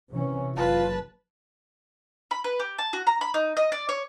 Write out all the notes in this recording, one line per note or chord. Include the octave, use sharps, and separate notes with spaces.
C3 E3 C#4
F#1 F4 B4 A5
B5
B4
G4
A5
F#4
A#5
B5
D#4
D#5
D5
C#5